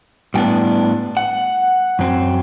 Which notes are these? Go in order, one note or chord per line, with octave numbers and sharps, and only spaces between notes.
A2 G3 B3 D4 G5
F#5
F#2 F#3 C4